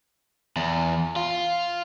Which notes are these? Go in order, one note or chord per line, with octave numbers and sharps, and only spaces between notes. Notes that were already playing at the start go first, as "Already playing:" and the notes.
E2
F4